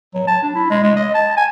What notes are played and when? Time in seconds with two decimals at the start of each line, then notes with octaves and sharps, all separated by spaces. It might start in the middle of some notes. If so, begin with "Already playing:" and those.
0.14 F#3
0.27 A5
0.43 D4
0.55 E4
0.70 G#3
0.83 G#3
0.96 D#5
1.14 A5
1.37 G#5